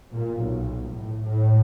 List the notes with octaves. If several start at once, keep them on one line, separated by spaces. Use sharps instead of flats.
A#2
B1
A2
A2